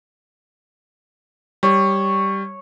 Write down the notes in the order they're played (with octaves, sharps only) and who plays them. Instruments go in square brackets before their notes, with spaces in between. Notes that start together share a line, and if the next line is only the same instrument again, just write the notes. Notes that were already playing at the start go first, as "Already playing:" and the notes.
[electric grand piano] G3 [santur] C#5